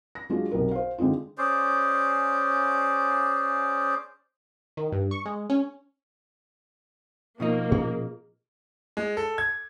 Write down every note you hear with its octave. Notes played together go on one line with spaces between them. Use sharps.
A#6
F#3 G#3 D4 F4 F#4
B1 C3 A#4
C5 F5
D3 G#3 C4 D#4 F4
C#4 G#4 C5 D5
D#3
G2
C#6
G#3
C#4
B2 F3 A#3 D#4
A#2 C#4 G#4
G#3
A4
G#6